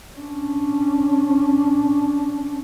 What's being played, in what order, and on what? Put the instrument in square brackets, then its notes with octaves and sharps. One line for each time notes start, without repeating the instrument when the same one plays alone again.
[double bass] C#4 D4